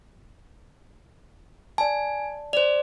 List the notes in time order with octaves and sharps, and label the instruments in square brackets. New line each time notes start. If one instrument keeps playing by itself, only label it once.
[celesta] D5 A5 [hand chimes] G#5
[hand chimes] C5 D5 [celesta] F7